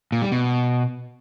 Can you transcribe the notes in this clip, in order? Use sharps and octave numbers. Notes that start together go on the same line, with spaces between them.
A#2
G3
B2